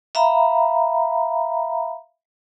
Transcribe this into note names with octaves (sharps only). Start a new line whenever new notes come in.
E5 F5 A#5 B5